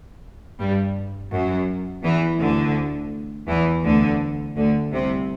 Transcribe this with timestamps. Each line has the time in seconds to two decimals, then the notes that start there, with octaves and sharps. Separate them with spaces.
0.60 G2 G3
1.32 F#2 F#3
2.04 E2 E3
2.40 D2 D3
3.48 E2 E3
3.84 D2 D3
4.56 D2 D3
4.92 C2 C3